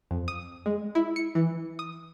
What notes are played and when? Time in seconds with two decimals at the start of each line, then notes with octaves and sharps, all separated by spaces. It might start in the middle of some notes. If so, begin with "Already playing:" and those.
0.11 F2
0.28 D#6
0.66 G#3
0.95 E4
1.16 C#7
1.35 E3
1.79 D#6